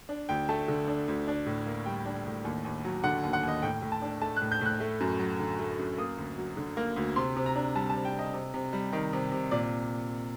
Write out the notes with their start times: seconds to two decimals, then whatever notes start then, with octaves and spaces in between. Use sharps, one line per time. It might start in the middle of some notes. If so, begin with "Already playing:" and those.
0.09 D4
0.29 D2 G5
0.49 A3 A5
0.68 D3
0.88 D4
1.08 D2
1.28 D4
1.46 A2
1.66 A#3
1.86 G3 G5
2.06 D4
2.26 A2
2.45 D#2
2.65 D#2
2.84 F#3
3.04 D3 F#5
3.23 D#2
3.33 F#5
3.43 D#2
3.48 D#5
3.62 A2 G5
3.82 A2
3.92 A5
4.02 D4
4.22 A3 A5
4.36 F#6
4.41 A2
4.51 G6
4.61 A2 F#6
4.80 A3
5.00 F#2
5.19 F#3
5.39 D3
5.59 A3
5.79 F#2
5.98 A#3 D#6
6.17 D2
6.38 F#3
6.57 D3
6.77 A#3
6.96 D2
7.16 C3 C6
7.36 C3
7.46 A#5
7.56 D4
7.75 G3 A5
7.90 A5
7.94 C3
8.05 G5
8.14 C3
8.19 D#5
8.33 C3
8.54 C3
8.73 G3
8.93 D#3
9.13 C3
9.32 C3
9.51 A#2 D5